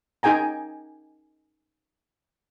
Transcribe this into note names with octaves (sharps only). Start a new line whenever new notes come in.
D#4 G#4 G5 G#5 A#5